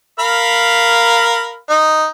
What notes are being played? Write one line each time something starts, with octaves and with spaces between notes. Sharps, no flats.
A#4 F5 B5
D#4